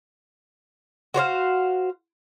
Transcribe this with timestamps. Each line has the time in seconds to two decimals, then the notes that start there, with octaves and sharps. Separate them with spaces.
1.14 F#4 C5 C#5 F5